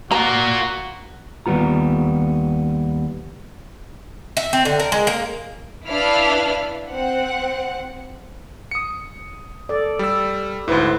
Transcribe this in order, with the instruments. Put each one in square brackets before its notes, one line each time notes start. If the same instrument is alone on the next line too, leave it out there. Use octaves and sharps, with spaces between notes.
[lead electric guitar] A#3 F4 [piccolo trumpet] F#4 [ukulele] A#5
[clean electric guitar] D#2 G3 B3 F4 A#5
[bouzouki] E5
C4
D3
A#4
G#3
A#3
[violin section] D4 E4 B4 F5 B5 F6
C4 F#5
[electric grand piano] D#6 C#7
[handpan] A4 D5
[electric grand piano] G3 E6
[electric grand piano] D2 G#2 [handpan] E4 B4 C5